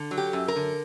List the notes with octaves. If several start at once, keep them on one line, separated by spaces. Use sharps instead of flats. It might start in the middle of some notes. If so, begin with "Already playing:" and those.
Already playing: D3
F#3
G4
F#2
A#4
D3